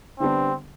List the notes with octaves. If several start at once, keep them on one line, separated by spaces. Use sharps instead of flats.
D3 G3 B3 C4 D4